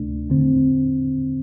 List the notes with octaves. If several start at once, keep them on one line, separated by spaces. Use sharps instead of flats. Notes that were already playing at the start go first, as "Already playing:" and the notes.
Already playing: D2 C3 A3 D4
E2 D3 C4